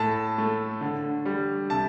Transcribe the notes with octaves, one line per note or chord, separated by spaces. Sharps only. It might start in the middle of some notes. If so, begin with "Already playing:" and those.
Already playing: A2 A5
A3
D3
G3
C3 A5